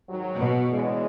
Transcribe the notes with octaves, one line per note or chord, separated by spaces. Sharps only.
G#2 D#3 F#3
B2
E2 C#3 E3 G#3